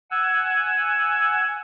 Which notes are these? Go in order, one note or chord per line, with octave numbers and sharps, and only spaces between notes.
F#5 G#5 E6